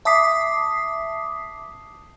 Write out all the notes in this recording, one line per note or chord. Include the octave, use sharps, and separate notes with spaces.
E5 A5 D6 D#6 B6 C7